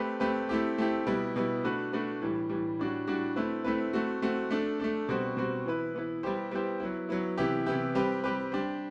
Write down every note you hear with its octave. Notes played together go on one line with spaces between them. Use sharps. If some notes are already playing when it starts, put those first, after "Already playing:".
Already playing: A3 C4 G4 B4
A3 C4 G4 B4
A3 C4 E4 G4
A3 C4 E4 G4
B2 G3 B3 E4
B2 G3 B3 E4
A3 D4 F#4 B4
A3 D4 F#4 B4
A2 E3 G3
A2 E3 G3
A2 G3 D4 F#4
A2 G3 D4 F#4
A3 C4 E4 B4
A3 C4 E4 B4
A3 C4 F#4
A3 C4 F#4
A3 D4 A4
A3 D4 A4
B2 G3 C4 F#4 C5
B2 G3 C4 F#4 C5
E3 B3 E4 B4
E3 B3 E4 B4
G3 B3 E4 G4 C5
G3 B3 E4 G4 C5
F#3 B3 E4
F#3 B3 E4
C3 E3 B3 E4 G4
C3 E3 B3 E4 G4
G3 C4 G4 B4
G3 C4 G4 B4
G3 D4 G4 C5